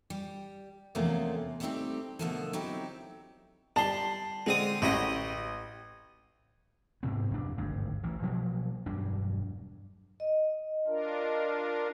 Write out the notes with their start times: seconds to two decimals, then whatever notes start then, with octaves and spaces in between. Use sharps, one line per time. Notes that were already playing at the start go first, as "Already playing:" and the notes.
0.10 G3
0.95 E2 C3 F3 A3 A#3 C#4
1.60 G3 A3 B3 C4 D#4 G4
2.19 B2 D3 F3 A3 A#3 A4
2.53 F#3 C4 D#4 E4 G4
3.76 G3 A5 C6
4.46 D3 G#3 C4 D#6
4.82 A1 F#4 G4 D#5
7.03 D2 G#2 C3 B3
7.31 F1 D4
7.58 G#1 D2 G2
8.03 A1 E3
8.22 B2 F3 F#3 A#3
8.86 E1 G2 F#3 D4
10.20 D#5
10.87 D4 F4 A#4